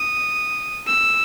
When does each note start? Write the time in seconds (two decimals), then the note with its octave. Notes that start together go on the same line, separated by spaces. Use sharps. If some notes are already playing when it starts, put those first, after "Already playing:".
Already playing: D#6
0.87 E6